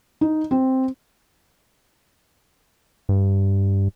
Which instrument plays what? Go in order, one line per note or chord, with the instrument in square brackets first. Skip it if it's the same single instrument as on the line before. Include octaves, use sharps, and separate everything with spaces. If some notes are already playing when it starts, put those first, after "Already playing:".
[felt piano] D#4
C4
[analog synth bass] G2